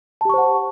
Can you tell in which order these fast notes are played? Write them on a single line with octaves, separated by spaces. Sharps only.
A5 G4 C#6 C5 F#5